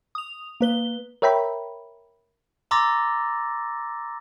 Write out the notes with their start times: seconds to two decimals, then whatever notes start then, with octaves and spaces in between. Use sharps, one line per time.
0.15 D#6 F7
0.61 A#3 B4 G7
1.22 A#4 C#5 E5 G5 A#5 B5
2.71 A#5 C6 D6 E6 A6 A#6